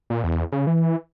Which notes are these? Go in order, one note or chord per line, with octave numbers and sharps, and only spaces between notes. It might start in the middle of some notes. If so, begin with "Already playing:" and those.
A#2
E2
C#3
E3